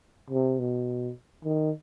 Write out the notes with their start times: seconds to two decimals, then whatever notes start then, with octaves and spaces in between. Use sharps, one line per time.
0.30 C3
0.59 B2
1.45 D#3